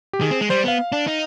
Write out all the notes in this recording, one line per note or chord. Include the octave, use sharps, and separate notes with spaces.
G4
D#3 G#4
C4
G#3
G3 C5
B3 F5
D4
D#4